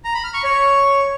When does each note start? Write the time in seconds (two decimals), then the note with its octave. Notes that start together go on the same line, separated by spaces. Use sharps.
0.05 A#5
0.14 B5
0.24 F6
0.34 C#6
0.44 C#5